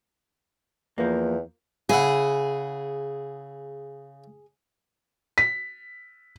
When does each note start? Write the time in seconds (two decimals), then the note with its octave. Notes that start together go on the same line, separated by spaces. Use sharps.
0.98 E2 F3 A#3
1.89 C#3 E4 G#4 F#5
5.38 B6